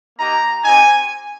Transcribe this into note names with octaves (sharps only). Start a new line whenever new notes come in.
A#3 D#4 G4 A#5
C4 D#4 G4 G#5